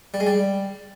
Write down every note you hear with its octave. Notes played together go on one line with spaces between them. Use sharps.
G3
G#3
G3